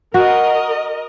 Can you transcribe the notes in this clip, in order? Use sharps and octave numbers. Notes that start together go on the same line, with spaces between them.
F#4 A#4 D#5